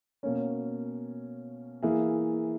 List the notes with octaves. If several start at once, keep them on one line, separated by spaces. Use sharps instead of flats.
B2 A#3 C#4
E3 A#3 E4 G#4